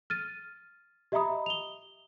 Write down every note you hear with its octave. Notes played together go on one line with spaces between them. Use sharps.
F6 A6 D#7
G4 D#5 E5 A#5 B5 D#6
F7 G7